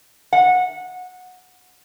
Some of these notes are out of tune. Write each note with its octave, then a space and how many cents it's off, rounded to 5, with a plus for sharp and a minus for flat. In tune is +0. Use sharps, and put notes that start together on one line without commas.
F#5 -15